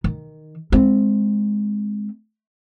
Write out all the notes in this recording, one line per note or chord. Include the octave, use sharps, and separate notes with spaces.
D#3
G#3 C4